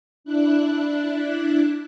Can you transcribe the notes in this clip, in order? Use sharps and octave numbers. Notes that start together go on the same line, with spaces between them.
D4 E4 F#6